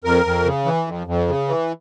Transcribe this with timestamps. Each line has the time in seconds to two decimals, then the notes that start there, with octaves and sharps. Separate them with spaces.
0.04 F2 A#4
0.25 F2
0.45 C#3
0.66 E3
0.87 F2
1.07 F2
1.28 C#3
1.48 E3